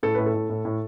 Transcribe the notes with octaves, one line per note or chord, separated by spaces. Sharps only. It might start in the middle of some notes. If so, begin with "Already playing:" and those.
A2 A4
A2 B4
A4
A2
A2
A2